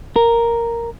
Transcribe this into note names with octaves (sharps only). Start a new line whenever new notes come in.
A#4